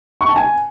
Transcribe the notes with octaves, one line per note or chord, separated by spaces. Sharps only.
C#6
A5
G#5